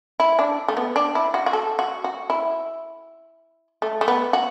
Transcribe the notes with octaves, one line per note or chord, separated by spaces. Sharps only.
E4
D4
A3
B3
D4
E4
F#4
F#4
A4
F#4
F#4
E4
A3
A3
B3
F#4